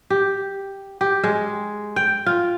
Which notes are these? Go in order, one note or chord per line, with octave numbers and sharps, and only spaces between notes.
G4
G4
G#3
G5
F4